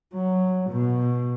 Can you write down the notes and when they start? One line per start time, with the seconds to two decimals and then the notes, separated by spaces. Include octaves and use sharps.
0.13 F#3
0.70 B2